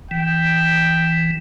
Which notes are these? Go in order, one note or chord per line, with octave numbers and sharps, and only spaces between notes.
E3 G5